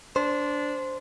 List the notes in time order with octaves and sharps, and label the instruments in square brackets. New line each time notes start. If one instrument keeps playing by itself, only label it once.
[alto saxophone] D4 [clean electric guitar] C5